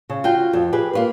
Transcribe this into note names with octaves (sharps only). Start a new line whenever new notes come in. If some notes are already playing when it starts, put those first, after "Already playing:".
C#3
F4 F#4 G5
F2
G4 G#4 B4
A#3 F4 B4